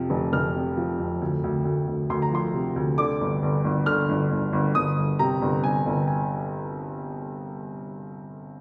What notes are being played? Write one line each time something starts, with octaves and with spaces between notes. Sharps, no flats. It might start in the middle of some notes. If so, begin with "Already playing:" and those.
Already playing: F2 C3 F3
F1
F1 F6
C3
F3
F2
D2
D2
D2
D2
D2 C6
A#5
F3 C6
C3
D2
D3 D6
G1
G1
G1
D3 F6
G1
G1
G1
G1 D#6
G1
C3 A#5
G1
G1 G#5
G1
G#5